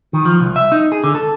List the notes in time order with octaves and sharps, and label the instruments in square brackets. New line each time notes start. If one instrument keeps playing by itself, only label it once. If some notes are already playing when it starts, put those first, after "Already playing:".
[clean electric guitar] D#3
F3
C2
E5
D#4
G#4
D3
A4